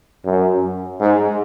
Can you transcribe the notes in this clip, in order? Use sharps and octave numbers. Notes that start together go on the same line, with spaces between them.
F#2
G#2